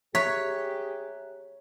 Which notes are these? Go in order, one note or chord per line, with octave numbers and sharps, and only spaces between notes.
G4 G#4 C#5 E5 A#5 F#6 B6